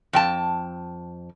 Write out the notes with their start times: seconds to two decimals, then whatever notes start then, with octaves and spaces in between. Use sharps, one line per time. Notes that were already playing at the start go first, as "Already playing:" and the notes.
0.13 F2 G5 A5